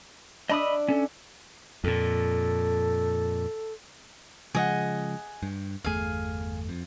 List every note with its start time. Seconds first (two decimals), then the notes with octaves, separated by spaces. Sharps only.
0.50 D4 D#5 E5 B5 D#6
0.88 C#4 A4
1.84 F2 A#2 A4
4.55 C#3 F3 G#3 G#4 D#5 F#5
5.43 G2
5.84 G1 E2 A3 G#4 F5
6.69 F2